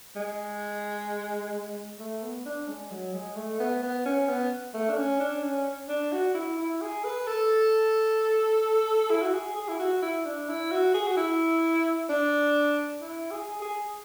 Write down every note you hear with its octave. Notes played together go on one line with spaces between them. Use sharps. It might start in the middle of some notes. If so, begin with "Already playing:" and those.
G#3
A3
B3
D4
G#3
F#3
G#3
A3
B3
B3
C#4
B3
A3
D4
C#4
D4
C#4
D4
F#4
E4
E4
G#4
B4
A4
E4
F#4
G#4
G#4
E4
F#4
E4
D4
E4
F#4
G#4
F#4
E4
D4
E4
G#4
G#4